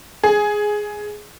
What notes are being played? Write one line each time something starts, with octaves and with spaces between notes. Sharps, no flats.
G#4